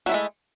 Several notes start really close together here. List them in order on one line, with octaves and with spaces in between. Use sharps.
F#3 E4 A3 G#3